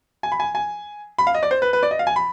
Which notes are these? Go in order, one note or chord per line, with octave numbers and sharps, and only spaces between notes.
G#5
B5
G#5
G#5
B5
F5
D#5
D5
C5
B4
B4
D5
D#5
F5
G#5
B5